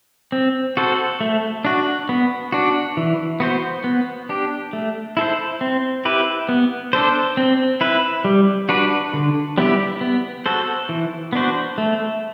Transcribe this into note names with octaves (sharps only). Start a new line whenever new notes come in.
C4
F#4 A4 C5
A3
D4 F#4
B3
D4 F#4
E3
B3 F#4 C5
B3
D4 G4
A3
E4 A4 C5
C4
E4 G4 B4
B3
D4 A4 C5
C4
E4 B4
G3
D4 F#4 B4
D3
G3 B3 E4 G4
B3
F#4 A4 C5
E3
B3 D4 F#4 C5
A3